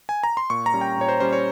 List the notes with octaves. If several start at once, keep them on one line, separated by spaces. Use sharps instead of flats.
G#5
A#5
C6
A#2 C#6
A#5
G3 C#4
G5
A#2 C#5
C5
G3 C#4 C5
C#5